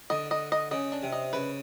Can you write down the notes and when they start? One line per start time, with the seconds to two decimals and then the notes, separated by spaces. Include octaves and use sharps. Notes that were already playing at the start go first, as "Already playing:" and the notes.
0.10 D3 D#5
0.31 D#5
0.52 D#5
0.71 C#3 D#5
0.92 D4
1.03 C3
1.12 D#5
1.33 C#3 B4